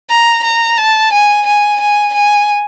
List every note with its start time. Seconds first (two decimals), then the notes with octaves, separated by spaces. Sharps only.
0.10 A#5
0.44 A#5
0.78 A5
1.13 G#5
1.46 G#5
1.80 G#5
2.14 G#5